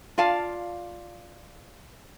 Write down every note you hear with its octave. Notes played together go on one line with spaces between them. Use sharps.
F4 D5 F5 A5